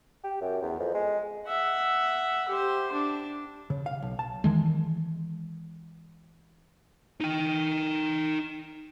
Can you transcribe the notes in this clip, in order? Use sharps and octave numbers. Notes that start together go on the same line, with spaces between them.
G4
F#2
E2
F2
G#3
E5 F#5
G4 C5
D4
C#3
F5
B1
A5
D#3 E3 G#3
D#4 G5